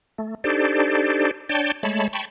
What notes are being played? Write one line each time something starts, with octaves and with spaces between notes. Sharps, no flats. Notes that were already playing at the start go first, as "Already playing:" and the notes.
A3
D4 D#4 G4 A4 C5 D5
D4 C#5 D5 G5 A5 G6
G#3 A3 C#5 A5 B5
G5 A5 B5 C#6